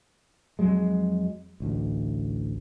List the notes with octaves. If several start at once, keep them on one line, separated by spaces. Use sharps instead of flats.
F2 F#3 G#3
A1 D2